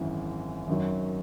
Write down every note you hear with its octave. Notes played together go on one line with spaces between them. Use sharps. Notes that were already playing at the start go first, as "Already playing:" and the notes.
Already playing: G#1 F#2 E3
F#2 D#3 F#3